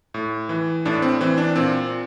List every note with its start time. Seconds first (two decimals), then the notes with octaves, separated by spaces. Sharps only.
0.14 A2
0.49 E3
0.85 A2 D4
1.02 C4
1.21 E3 C4
1.38 D4
1.55 A#2 C4